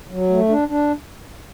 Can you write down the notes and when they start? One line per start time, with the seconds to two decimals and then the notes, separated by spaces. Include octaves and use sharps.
0.10 F#3
0.29 A3
0.49 D4
0.68 D4